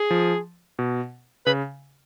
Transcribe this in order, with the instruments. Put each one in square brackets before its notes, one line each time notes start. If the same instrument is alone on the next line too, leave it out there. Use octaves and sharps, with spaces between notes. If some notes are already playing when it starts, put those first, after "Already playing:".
Already playing: [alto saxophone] G#4
[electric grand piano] F3
B2
[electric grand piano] C#3 [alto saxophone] B4